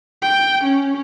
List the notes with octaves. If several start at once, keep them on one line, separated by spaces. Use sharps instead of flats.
G5
C#4